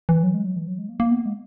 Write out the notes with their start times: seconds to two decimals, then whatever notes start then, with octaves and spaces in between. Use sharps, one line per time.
0.09 E3
0.23 F#3
0.34 G#3
0.45 F#3
0.56 E3
0.67 F#3
0.78 G#3
0.89 A#3
1.00 A#3
1.11 B3
1.19 A#3
1.26 G#3